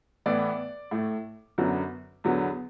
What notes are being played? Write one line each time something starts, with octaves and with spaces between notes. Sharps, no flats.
A2 E3 B3 D5
A2 A3
F#2 D3 F#3 B3
E2 D3 F#3 B3